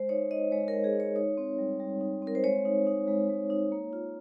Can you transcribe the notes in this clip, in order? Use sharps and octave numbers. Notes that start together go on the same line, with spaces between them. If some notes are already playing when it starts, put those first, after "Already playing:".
Already playing: G#3 C5
D#4 C#5
D#4 D#5
G#3 C#5
A#4
G#3
G#4
D#4
C#5
D#4 C#5
C4
G3
G3
D#4
C4
A#4
C5
G#3 C#5
D#4
D#4
G#3
G#3
D#4
A#3
F4